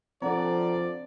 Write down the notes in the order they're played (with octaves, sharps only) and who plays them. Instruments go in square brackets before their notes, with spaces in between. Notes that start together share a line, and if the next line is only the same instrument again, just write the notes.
[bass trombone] F3 [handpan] C4 D4 [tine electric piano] A4 F#5 A#5 [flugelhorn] D5